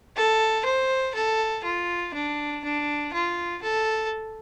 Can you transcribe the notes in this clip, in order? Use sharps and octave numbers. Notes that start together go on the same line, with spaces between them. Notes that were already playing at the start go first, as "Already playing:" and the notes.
A4
C5
A4
F4
D4
D4
F4
A4